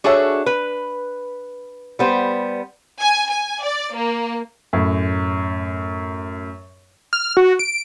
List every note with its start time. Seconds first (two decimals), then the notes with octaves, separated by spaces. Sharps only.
0.04 D4 F#4 G#4 A4 C#5 E5
0.46 B4
1.99 G3 B3 C5
3.00 G#5
3.30 G#5
3.63 D5
3.95 A#3
4.73 F#2 A2
7.13 F6
7.37 F#4
7.59 D7